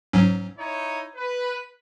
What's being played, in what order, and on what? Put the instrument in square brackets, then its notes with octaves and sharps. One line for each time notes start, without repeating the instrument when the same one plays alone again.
[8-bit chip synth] G#2 F#3 C#4
[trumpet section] D#4 E4 C#5
B4